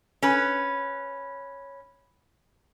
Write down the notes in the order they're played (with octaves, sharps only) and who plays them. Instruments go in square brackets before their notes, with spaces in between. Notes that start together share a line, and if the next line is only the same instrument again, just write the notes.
[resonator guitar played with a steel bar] C#4 B4